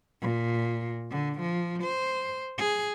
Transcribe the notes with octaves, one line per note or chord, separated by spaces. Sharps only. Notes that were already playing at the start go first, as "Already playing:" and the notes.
A#2
D3
F3
C5
G#4